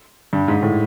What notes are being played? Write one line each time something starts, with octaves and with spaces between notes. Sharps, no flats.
G2
G#2
A2